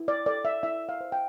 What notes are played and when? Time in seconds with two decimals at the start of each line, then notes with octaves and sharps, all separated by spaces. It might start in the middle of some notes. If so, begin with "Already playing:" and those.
Already playing: E4
0.08 D5
0.26 A4 D5
0.45 E5
0.63 E4 E5
0.89 F5
1.01 C5
1.12 G5